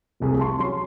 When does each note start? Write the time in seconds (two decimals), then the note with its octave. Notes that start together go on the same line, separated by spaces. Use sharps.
0.20 F1 C2 G#4
0.39 A5 C6 C#6
0.58 F#3 C#4 C6